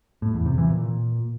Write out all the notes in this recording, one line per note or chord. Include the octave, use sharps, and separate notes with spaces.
A2
E2
C3
E3
A#2